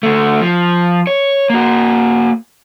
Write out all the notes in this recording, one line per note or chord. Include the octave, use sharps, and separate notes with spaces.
D2 A3
F3
C#5
A#3 F#4